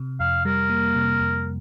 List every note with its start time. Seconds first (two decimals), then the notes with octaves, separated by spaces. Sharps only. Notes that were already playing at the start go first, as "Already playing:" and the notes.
Already playing: C3
0.20 F2 F5
0.45 G3 A#4
0.70 A#3
0.95 C3
1.21 F2